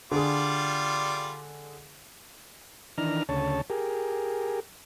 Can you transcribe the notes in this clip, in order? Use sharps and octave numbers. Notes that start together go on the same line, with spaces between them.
D3 G3 F4 G#4 D5
D#3 E3 D4 A#5 F6
D2 C#3 C#5 A5
G4 G#4 A#4